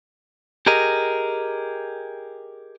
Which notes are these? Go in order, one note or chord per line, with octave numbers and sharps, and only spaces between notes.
G4 G#4 A#4 D#5